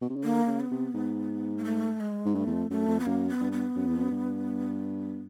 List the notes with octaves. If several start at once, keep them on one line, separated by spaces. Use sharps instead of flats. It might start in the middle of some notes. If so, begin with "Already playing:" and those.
B2
C3
C#3
D3 A#3
C#3
B3
C3
G#2
A#3
A3
G#3
G#2
G2 A3
E2
F2
F#2 A3
F2
B3
F#2 A#3
B3
G2
B3
F#2
E2
F2
F#2
G2